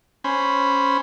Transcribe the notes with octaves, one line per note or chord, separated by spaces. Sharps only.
C#4 C5 B5